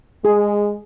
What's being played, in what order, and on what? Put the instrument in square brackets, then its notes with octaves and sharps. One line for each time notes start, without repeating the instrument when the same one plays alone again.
[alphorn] G#3 [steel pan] G#4